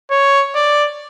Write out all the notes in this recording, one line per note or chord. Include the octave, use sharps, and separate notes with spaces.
C#5
D5